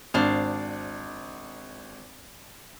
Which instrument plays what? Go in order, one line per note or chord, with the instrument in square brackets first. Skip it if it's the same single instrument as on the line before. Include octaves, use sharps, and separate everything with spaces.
[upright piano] G#1 [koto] D4 C5 F5